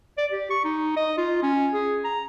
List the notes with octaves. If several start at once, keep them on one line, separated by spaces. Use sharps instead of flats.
D5
G4
C#6
D#4
D#5
F4
C#4
G#4
A#5